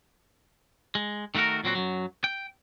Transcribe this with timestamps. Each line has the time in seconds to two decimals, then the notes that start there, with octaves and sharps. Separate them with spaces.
0.95 G#3
1.35 D#3 A3 F4 F#4 A#4
1.64 A#2 F#3 C4 F#4
1.75 F#2 F#3
2.24 G5